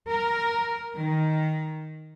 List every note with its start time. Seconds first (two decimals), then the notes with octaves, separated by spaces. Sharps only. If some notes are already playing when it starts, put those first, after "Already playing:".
0.11 A#4
0.97 D#3